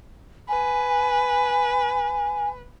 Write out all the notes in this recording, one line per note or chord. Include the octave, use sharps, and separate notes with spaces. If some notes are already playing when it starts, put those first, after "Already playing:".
B4 G#5